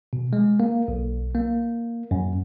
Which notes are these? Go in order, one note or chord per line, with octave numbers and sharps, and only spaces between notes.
B2
G#3
A#3
B1
A#3
F#2